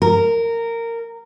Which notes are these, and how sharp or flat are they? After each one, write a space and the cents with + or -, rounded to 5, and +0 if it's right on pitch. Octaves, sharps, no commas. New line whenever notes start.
A#4 -15